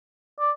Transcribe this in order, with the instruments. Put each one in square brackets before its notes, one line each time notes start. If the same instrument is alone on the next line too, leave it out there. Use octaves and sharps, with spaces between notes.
[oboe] D5